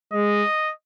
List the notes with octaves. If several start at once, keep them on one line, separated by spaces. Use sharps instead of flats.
G#3 D#5